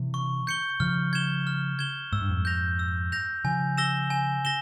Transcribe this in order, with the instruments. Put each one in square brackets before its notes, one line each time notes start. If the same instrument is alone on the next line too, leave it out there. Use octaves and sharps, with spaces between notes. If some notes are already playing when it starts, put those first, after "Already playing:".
Already playing: [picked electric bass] C3 E3
[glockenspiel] C#6
G6 C#7 G7
[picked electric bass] C#3 F3 [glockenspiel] F6
[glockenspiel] G#6 E7 G7
F6
G#6 E7 G7
[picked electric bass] G#2 [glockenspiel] E6
[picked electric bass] G2
F2 G#2
[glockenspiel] G6 A#6 F7
E6
G6 A#6 F7
[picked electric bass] C#3 F3 [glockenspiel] G#5
[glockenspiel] E6 A#6 E7 G7
G#5
A#6 E7 G7